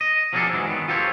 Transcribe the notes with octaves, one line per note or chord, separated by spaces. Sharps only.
D#5
F3 F#3 A#3 D4 G#4 A4
G#2 E3 F#3 G#3
D#3 B3
F4 G4 A4 C5 C#5